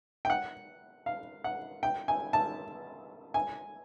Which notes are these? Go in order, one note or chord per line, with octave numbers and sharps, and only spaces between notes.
G5
F#5
F5
F#5
G5
G#5
A5
G#5